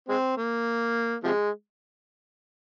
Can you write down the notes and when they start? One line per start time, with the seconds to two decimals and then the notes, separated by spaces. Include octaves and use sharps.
0.09 G#3 C4
0.37 A#3
1.24 C3 F3 G#3